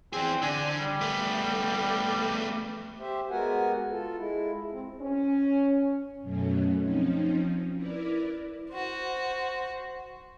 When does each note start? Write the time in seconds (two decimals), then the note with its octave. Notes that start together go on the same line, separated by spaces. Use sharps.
0.13 E3 C4 G#4
0.42 D3 G#5
0.78 G3
1.01 A3 B3
3.00 G4 C5 E5
3.30 G#3 B3 F#4 A#4 F#5 G#5
3.90 F4 A4
4.17 G#3 E4
4.72 C4
5.01 C#4
6.22 F#2 B2 F#3 A3 C#4
6.81 F3 C4 C#4 D#4
7.75 E4 A#4 B4 D5
8.70 F#4 C5